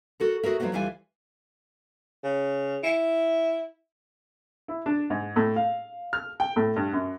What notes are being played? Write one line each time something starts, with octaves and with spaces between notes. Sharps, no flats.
F#4 A4 A#4
F#4 G#4 A#4 E5
F3 F#3 A3 B3 C#4 F#4
D2 E3 G3 F4 G#5
C#3
E4
E4
D4
G#2
A2
F5
F6
G5
A2
G2
F#2